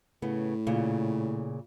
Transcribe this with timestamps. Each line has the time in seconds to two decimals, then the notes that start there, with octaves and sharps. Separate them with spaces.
0.22 A2 C#3 B3
0.67 A#2 C#3